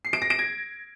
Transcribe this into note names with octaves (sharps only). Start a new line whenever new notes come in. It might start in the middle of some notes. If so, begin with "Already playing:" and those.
C7
D7
A#6
D7
G#6